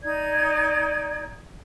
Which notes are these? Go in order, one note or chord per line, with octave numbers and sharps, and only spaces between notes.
D#4 D5 G#6